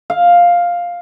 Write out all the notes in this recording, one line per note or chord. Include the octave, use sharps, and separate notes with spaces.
F5